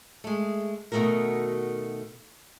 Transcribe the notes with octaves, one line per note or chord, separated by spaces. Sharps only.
G#3 A3
B2 D#3 E3 A3 F#4 A#4